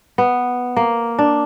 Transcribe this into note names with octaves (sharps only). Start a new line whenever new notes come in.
B3
A#3
D4